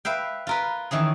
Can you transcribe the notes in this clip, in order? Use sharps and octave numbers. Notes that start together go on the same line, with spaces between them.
B4 E5 F5 G5
F4 A#4 B4
D#3 E3 C#4 G#4